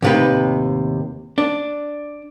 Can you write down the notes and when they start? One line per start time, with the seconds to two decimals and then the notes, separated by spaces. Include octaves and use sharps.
0.02 D#2 A2 C3 D#4 B4
1.38 D4